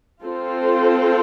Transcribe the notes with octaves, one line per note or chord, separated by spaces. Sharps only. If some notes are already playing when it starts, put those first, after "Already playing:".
C4 F4 A4 C5